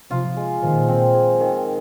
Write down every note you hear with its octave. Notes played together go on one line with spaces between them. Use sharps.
C3 F3 F4
G#3
A#2 D#3 F3
C4
G#4
D#3